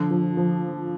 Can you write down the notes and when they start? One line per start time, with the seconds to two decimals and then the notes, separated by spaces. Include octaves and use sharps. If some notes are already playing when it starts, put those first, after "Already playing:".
Already playing: D3 F3
0.11 F3
0.37 F3